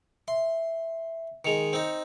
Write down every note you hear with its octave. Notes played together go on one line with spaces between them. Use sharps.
E5 C6
D#3 G#3 C#7 F7
C4 D#4